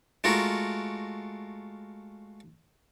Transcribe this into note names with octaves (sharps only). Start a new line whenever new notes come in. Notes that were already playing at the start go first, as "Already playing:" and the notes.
G#3 A3 F4 F#4 A#4